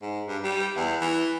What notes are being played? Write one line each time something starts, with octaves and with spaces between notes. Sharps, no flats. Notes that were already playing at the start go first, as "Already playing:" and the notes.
G#2
G2
G3
E2
E3